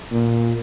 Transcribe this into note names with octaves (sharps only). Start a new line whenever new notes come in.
A#2